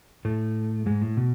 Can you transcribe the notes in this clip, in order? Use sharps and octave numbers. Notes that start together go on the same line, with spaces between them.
A2 A3
G#2 G#3
A2
B2